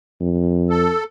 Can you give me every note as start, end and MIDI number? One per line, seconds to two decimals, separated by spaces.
0.21 0.90 41
0.70 1.04 69